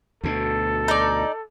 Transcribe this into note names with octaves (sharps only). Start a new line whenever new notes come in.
D2 B2 A4
D#4 D5